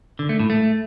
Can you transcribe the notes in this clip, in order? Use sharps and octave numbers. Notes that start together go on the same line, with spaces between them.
D3
A3
A2
A3